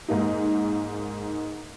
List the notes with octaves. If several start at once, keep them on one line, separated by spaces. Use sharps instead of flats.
G#2 A#3 D#4